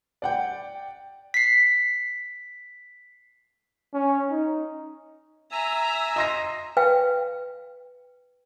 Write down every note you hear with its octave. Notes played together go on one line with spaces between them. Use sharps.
D5 F#5 G5
B6 C7
C#4
D#4
E5 G#5 A#5 E6
D#5 C6 A#6
B4 F5 G5